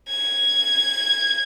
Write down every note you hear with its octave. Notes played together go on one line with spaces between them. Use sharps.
G#6